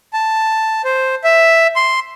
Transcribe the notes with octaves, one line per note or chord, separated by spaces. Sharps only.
A5
C5
E5
C6